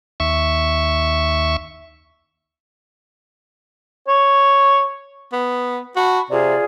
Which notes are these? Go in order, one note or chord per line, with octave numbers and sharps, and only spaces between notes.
D#2 E5 C#6
C#5
B3
F#4 A5 B5 C#6
C3 F4 G#4 D5